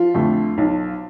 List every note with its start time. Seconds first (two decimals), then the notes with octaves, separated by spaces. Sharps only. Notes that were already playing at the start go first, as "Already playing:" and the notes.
Already playing: F3 F4
0.14 F2 D3 A3
0.58 B1